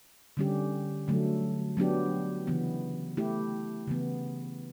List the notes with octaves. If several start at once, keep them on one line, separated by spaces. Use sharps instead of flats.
D3 G3 C#4 G4
D3 F#3 A3
F#3 B3 D4 G4
C#3 E3 B3
A3 E4 G4
C#3 E3 B3